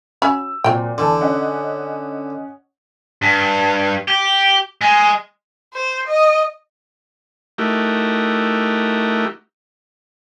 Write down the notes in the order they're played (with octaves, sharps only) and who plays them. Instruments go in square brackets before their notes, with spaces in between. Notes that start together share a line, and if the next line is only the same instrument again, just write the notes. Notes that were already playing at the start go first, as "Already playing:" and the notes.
[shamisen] C#4 F#4 B5 [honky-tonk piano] E6
[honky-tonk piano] A#2 C4 [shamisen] F#3 G5
[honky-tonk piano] E2 A5 [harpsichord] D3
[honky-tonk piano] C#4 D#5 F#5
[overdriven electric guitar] G2
G4
G#3
[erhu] C5
D#5
[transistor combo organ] A3 D#4 E4 F#4 G4 A#4